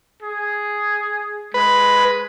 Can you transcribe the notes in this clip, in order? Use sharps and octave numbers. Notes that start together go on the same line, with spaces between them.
G#4
G#3 B4